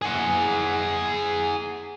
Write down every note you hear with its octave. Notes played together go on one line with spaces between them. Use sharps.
G#4 F#5